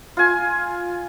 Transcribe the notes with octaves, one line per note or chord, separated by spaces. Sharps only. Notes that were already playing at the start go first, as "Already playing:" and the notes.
F4 G#5